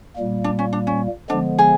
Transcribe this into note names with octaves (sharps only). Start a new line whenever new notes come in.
A#2 G3 A#3
D4
C#4
D4
C#4
D3 F3 G#3 B3 D4
G#4